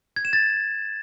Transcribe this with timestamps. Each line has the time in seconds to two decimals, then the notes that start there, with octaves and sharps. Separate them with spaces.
0.16 G#6
0.25 E7
0.33 A6